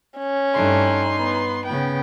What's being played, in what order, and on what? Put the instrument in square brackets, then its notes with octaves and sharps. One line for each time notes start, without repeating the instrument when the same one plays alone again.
[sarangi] C#4
[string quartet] G2 A3 D4 [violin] D#4 C6
[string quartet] B3 B4
[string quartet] C#3 B3 [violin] G5